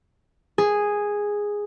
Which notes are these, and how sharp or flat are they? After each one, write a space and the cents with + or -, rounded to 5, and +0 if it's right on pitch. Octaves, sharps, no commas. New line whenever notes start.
G#4 -5